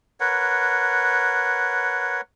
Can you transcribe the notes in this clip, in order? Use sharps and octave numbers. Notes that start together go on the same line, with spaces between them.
A#4 B4 C#5 F#5